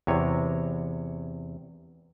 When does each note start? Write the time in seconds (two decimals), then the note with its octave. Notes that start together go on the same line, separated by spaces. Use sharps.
0.07 E2 C3 C#5